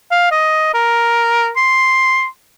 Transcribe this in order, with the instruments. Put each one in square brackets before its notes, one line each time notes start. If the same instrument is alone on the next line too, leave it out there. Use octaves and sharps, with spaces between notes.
[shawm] F5
D#5
A#4
C6